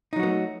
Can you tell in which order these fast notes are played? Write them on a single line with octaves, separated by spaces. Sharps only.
D#4 F#3 F#4 B3 A3